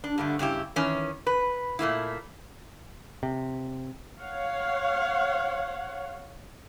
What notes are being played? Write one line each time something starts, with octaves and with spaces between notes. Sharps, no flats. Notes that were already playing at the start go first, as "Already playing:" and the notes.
D4
G2 D3 A3
G2 C#3 E4 G4
D#3 E3 C#4
B4
A#2 A3 A#3 E4
C3
C#5 F5 F#5